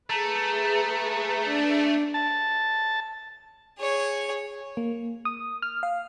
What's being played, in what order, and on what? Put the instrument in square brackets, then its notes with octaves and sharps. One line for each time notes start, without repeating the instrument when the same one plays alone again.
[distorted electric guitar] A3 [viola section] G#4 B4 [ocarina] A#5
[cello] D4
[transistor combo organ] A5
[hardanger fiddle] G#4 C#5
[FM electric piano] A#3
D#6
F6
F5